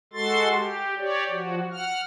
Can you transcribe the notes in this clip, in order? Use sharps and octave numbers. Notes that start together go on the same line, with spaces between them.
G#3 F#4 A4 C6 A6
G4
G4 C#5 D5
F3 F#4
F#5 F6